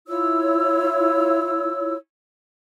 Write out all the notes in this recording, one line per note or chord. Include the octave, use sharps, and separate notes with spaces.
E4 F4 C#5 E6